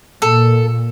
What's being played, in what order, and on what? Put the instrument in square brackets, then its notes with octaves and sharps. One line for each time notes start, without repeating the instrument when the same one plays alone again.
[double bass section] A#2 [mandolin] A4